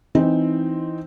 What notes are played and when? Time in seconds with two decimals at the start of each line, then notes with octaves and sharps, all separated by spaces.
0.15 E3 C4 D#4